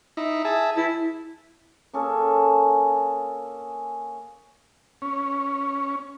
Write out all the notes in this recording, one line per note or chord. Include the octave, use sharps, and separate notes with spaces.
D#4 E4
G#4 E5 A5
E4 A5
A#3 C#4 G#4 A4
C#4